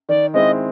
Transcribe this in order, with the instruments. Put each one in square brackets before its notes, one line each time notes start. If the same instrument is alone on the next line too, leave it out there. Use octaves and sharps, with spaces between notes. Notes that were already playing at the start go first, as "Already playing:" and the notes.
[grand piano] D#3 [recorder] D5
[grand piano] G#3 C4 E4 [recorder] D#5